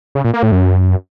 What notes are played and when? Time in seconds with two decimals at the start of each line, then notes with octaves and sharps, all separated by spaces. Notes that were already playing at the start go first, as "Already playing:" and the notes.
0.15 C#3
0.24 A#2
0.34 A#3
0.43 A2
0.52 F#2